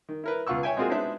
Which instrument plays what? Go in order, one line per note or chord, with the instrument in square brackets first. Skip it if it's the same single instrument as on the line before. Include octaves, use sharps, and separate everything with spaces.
[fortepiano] D#3
E4 A#4 B4
C#2 B3 F4 F#5 C#6 E6
C#5 E5 G5 G#5
G#3 A#3 C4 F4 F#4 G#4
G#3 B3 D4 D#4 C5 E5